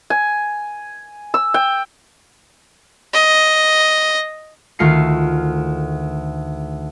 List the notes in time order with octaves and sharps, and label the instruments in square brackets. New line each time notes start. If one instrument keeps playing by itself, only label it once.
[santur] G#5
E6
G5
[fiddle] D#5
[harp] D2 D#3 A3 F4 C7 C#7